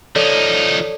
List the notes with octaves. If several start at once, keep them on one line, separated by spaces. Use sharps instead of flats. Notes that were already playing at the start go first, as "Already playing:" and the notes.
F3 D#4 A4 C#5 D5